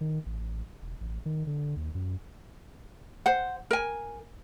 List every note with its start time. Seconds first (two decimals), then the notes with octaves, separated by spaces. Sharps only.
0.01 D#3
0.26 A1
0.82 E1
1.01 A1
1.26 D#3
1.47 D3
1.76 D#2
1.95 F#2
3.26 C5 F#5
3.71 A#4 G#5